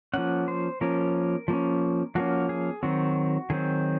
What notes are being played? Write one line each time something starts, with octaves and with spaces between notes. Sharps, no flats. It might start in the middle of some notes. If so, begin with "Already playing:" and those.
F3 A#3 C#4 F#5
C5
F3 A#3 C#4 A#4
F3 A#3 C#4
F3 A#3 C#4 F#4
G#4
D#3 F#3 C4 F#4
D#3 F#3 C4 G#4